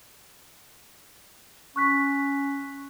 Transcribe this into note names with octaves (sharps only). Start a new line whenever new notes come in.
C#4 C#6 F#6 B6